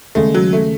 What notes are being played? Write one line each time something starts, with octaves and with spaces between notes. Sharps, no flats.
D#2 C#3 G#3 A3
F#3
A3